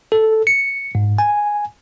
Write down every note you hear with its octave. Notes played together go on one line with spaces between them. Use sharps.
A4
C#7
G#2
G#5